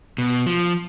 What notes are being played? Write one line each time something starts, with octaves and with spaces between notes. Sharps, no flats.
B2
F3